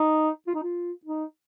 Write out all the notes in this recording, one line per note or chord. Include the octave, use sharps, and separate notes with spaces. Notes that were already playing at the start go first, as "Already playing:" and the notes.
Already playing: D#4
F4
D#4
F4
D#4